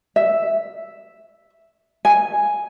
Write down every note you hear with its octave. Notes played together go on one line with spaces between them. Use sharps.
E5
G#5